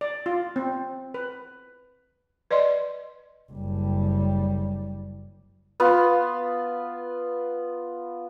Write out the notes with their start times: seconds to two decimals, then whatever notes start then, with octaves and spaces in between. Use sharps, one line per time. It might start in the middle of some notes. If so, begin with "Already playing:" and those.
0.01 D5
0.26 F4
0.56 C4
1.14 B4
2.51 B4 D5 D#5 C6
3.52 F#1 G3
5.80 B3 F4 B4